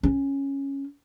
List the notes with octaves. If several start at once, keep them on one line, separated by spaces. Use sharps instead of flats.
C#4